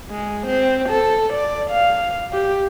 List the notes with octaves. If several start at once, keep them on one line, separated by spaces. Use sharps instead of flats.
G#3
C4
A4
D5
F5
G4